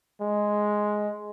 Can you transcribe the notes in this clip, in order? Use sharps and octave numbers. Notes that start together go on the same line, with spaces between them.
G#3